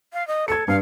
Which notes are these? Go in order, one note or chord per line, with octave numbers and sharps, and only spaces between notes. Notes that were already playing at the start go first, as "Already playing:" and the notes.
F5
D#5
A4 G#6 C#7
G2 F5